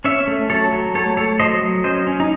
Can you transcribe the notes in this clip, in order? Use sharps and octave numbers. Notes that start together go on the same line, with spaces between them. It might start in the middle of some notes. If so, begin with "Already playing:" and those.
C#4 C#5 E5
A3
F#3 A4 C#5
F#3
A3 A4 C#5
A3 A4 C#5
F#3 C5 D#5
F#3
C#4 C5 D#5
C#4
D#4